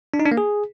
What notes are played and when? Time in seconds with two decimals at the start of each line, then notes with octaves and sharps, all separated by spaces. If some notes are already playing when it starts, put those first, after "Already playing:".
0.14 D4
0.20 D#4
0.26 D4
0.32 A#3
0.37 G#4